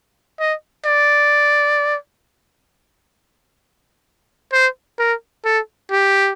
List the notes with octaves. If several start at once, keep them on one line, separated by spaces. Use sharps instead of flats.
D#5
D5
C5
A#4
A4
G4